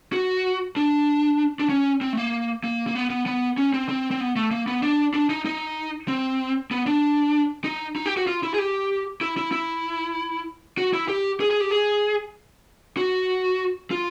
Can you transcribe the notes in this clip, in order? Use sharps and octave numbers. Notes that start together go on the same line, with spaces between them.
F#4
D4
D4
C#4
C4
A3
A#3
A#3
A#3
B3
B3
B3
C#4
C4
C4
C4
B3
A3
A#3
B3
D4
D4
D#4
D#4
C4
B3
D4
D#4
D#4
G4
F#4
F4
E4
G#4
G4
E4
E4
E4
F#4
E4
G4
G#4
G#4
G4
G#4
F#4
F4